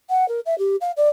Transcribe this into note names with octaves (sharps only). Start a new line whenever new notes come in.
F#5
A#4
E5
G4
F5
D5